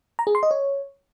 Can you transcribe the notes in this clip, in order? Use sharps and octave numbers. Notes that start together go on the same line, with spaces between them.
A#5
G#4
C6
D#5
C#5